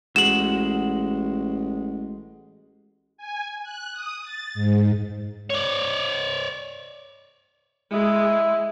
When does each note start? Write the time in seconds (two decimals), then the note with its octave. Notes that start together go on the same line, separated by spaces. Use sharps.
0.16 A1 G#3 F#4 E7 F#7
3.17 G#5
3.63 F#6
3.93 D#6
4.22 A6
4.54 G#2
5.50 C#5 D5
7.93 G#3 E4